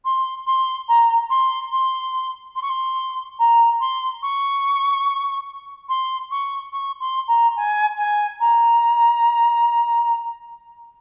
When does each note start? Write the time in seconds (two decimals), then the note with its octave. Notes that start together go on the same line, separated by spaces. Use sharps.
0.04 C6
0.46 C6
0.88 A#5
1.29 C6
1.71 C6
2.55 C6
2.62 C#6
2.69 C6
3.38 A#5
3.80 C6
4.22 C#6
5.88 C6
6.30 C#6
6.72 C#6
7.00 C6
7.27 A#5
7.56 G#5
7.97 G#5
8.40 A#5